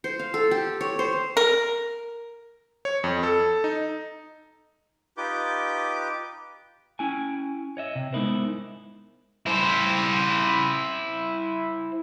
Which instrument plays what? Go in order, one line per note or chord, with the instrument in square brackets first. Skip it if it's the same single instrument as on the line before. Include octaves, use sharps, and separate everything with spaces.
[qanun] C5
F5
A4
G4
C#5
C5
[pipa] A#4
[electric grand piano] C#5
F2
A4
D#4
[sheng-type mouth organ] D#4 F4 G4 B4 D6 G6
[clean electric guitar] C#4 E4 G5 G#5
C#5 D#5 E5
C3
G#3 B3 D#4 E4 A#4 C5
[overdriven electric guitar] E4 C5